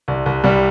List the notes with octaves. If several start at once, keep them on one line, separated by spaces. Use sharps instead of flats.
C2
C2
C2 G3